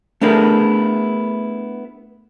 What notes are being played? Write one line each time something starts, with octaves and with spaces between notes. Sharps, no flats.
A3 B3 D4 E4 G#4 A#4